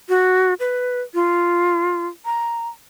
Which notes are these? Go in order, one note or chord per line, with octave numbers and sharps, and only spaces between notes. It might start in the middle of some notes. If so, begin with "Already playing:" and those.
F#4
B4
F4
A#5